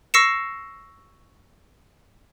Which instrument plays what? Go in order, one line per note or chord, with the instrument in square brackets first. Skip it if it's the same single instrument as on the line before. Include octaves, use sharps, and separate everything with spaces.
[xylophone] C#6 E6 A#6 C7 C#7 E7